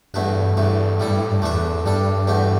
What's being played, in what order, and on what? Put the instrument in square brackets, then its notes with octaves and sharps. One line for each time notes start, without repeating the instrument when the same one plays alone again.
[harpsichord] E2 B2 A3 E4 B4 [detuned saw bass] G2
[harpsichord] E2 E3 A3 [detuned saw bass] G2
[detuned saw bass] A2 [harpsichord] G3 E4 A4
[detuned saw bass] G2
A2
G2
[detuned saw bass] E2 [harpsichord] A3 D4 B4 E5
[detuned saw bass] G2 [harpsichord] G3 D4 A4
[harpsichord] E2 B2 A3 G4